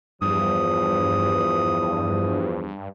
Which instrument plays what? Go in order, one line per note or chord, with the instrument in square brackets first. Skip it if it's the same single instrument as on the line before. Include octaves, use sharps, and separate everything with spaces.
[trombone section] E2 F3 [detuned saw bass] G2 [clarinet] D#6